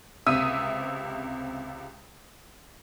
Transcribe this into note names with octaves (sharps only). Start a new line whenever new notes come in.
C#2 C3 E5 D#6 E6 D#7